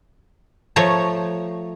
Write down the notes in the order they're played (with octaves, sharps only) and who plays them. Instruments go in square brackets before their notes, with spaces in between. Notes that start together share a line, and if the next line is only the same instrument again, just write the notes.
[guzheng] F3 A3 C#5 A#5